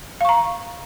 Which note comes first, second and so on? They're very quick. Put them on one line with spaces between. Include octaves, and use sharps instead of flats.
F5 C#6 A#5